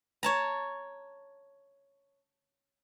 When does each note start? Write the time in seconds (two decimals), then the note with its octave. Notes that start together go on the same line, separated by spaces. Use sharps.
0.23 C#5 A5 A#5